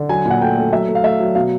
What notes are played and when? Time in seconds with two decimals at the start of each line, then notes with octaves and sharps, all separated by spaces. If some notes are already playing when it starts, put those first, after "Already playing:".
Already playing: D3
0.09 F#3 G#5
0.26 A#2 F#5
0.41 A3 G5
0.57 A3
0.72 F#3 E5
0.88 A3
0.95 F5
1.03 A3 E5
1.20 F#3
1.35 B2 F5